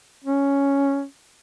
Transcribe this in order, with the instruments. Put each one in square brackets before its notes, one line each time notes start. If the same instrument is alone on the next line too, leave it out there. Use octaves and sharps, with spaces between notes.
[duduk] C#4